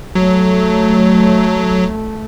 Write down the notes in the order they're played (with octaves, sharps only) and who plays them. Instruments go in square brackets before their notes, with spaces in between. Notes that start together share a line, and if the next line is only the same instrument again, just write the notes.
[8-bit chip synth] F#3 [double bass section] A3